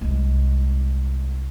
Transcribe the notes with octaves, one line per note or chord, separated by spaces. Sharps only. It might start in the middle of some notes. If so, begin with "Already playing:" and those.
C2 G#3